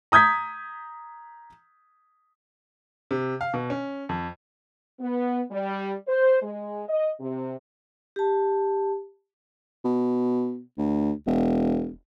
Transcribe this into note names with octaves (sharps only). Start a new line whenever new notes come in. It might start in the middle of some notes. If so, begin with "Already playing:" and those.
A#5 D#6 G6 G#6 B6
C3
F5
B2
C#4
F2
B3
G3
C5
G#3
D#5
C3
G4 A5
B2
D2
E1